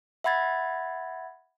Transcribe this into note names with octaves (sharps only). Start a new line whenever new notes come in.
E5 F#5 B5 G#6 A6